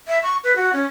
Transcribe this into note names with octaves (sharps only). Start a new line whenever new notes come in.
E5
C#6
B4
F#4
C#4